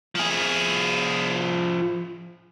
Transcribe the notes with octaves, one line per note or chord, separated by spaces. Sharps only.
F3 G#4